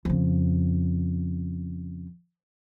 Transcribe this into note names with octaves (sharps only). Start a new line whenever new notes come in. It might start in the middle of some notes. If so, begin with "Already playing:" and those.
F2 C#3